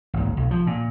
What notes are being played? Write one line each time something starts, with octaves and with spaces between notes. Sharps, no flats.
G#1 D#2
B1
F3
A#2